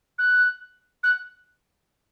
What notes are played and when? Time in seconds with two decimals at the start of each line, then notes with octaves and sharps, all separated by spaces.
0.19 F#6
1.04 F#6